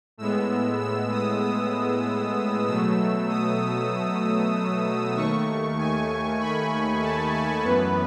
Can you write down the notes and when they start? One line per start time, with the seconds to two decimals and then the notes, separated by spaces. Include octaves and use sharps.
0.18 A2 G#3 B3 E6
0.80 E6
1.11 D#6
1.42 D#6
2.66 B2 F#3 A3 E6
3.28 D#6
5.15 D#2 D#3 A3 C#6
5.78 G#5
6.39 B5
7.02 A5
7.34 G#5
7.64 F#2 E3 B3 B4